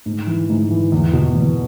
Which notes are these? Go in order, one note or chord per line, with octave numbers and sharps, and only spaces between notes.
G#2
E3
G#2
E3
E2
B2
E2